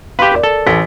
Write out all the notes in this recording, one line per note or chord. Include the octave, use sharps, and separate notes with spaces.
G4 B4 F5 C6
A#4 D5
A4
A1 B6